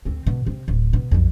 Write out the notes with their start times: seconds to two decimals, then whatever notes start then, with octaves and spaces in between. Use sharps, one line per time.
0.05 D2 C4
0.26 B2
0.47 C3
0.68 D1
0.93 B2
1.11 B1 F2